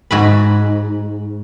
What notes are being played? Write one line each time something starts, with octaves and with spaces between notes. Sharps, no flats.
G#2 F#4 B5